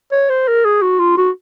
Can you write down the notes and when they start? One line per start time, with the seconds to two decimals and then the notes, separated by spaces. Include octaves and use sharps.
0.12 C#5
0.29 C5
0.48 A#4
0.65 G#4
0.82 F#4
0.99 F4
1.17 F#4